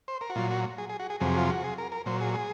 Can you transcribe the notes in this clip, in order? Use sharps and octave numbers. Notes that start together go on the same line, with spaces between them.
C5
A#4
F#4
A#2 F#3 F4
F#4
G#4
G#4
F#4
G#4
F2 C3 F#3 G#4
F4
F#4
G#4
A#4
A#4
A#2 F#3 C5
G#4
G#4